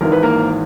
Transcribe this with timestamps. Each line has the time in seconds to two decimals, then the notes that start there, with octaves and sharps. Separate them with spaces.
0.01 G#1 G#2 E3 A#4
0.12 B4
0.23 A#3 A#4